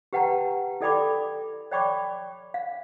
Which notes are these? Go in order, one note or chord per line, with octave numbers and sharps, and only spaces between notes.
G4 B4 F#5 G5 A5 A#5
E4 A4 D5 G5 B5 D6
C#5 D5 G5 B5 C#6 D6
F5